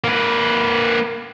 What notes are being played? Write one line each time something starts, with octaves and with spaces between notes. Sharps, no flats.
A#3 B4